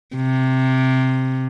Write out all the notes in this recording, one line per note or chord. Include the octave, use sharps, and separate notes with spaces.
C3